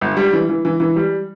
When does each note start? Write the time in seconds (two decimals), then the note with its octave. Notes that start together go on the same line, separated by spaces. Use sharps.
0.01 G1
0.17 G3
0.33 E3
0.49 E3
0.65 E3
0.80 E3
0.96 G3